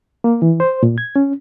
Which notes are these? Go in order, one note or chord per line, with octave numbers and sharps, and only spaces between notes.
A#3
E3
C5
A#2
G#6
C#4